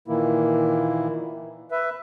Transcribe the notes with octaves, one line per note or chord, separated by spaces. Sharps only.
A#2 D#3 E3 A#3 E4
B4 E5